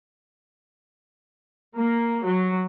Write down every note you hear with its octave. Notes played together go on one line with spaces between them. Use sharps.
A#3
F#3